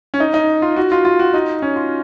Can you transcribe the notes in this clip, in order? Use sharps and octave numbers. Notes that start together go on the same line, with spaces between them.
C#4
D#4
D#4
F4
F#4
F4
F4
F#4
D#4
C#4
F4